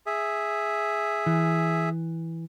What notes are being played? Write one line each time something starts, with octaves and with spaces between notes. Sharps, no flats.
G#4 E5
E3